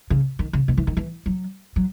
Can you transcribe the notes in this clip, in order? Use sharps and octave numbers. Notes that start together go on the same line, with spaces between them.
C#3
D#3
C#3
B2
E3
D#3
E3
F#3
F#3